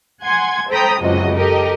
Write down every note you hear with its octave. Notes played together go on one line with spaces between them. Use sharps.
F#5 G#5 C6 G#6
A4 C5 G5 A#5 B5 D#6
C#2 F#2 C3 F#4 D#5
G4 A4 A#4 D#5